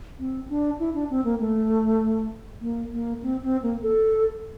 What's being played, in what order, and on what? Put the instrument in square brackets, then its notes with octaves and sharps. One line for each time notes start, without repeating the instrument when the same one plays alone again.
[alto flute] C4
D4
E4
D4
C4
A#3
A3
A#3
A#3
C4
C4
A#3
A4